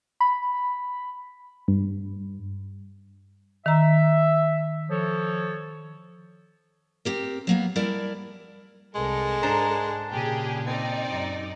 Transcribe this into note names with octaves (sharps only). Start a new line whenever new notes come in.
B5
G2
D#3 E5 A#5
F3 A4 C#5
C4 G4 A#4
F#3 A#3 B3
G3 E4 A#4 D5 A5
C2 G#3 A4 A#4
G#2 D4 C5 A#5
A#2 C#3 G4 G#4
C4 D#4 D5
F#2